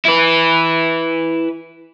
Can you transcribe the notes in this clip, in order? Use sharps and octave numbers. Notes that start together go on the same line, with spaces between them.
E4 B4